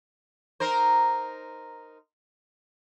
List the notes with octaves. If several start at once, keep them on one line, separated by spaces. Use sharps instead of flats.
D#4 A#4 C5